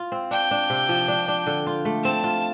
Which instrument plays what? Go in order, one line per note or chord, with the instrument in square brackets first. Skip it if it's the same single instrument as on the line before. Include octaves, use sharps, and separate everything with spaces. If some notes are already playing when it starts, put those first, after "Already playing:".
Already playing: [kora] F4
C4
[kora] D4 [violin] G5
[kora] D4
C3
F3
D4
D4
D3
F4
A3
[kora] C4 [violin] A5
[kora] F4